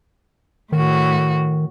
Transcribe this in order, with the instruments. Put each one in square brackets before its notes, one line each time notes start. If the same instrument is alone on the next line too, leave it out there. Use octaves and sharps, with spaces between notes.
[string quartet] A2 F#4 [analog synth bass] D#3